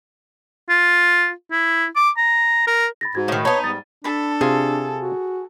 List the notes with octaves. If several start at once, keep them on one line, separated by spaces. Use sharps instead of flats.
F4
E4
D6
A#5
A#4
B5 A6 A#6
G#2 F#4 G#6
A2 D#3
B3 D#4 C#5 A5 B5
G#2 G3 A6
D4 A4 A5 B5
C3 F4 G#4
F#4